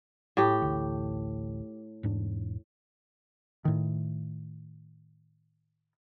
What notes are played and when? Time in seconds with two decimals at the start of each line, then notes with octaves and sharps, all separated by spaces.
0.37 A2 G4
0.62 A1 D2
2.03 E1 G#2 D4
3.65 A2 D#3